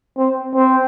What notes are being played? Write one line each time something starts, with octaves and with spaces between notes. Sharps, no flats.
C4
C4